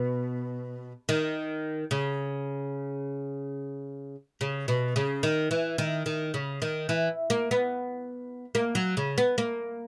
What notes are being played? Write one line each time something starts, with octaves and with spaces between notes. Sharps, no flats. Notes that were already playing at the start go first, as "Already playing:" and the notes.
Already playing: B2
D#3
C#3
C#3
B2
C#3
D#3
E3
D#3
D#3
C#3
D#3
E3
A#3
B3
A#3
F#3
C#3
B3
A#3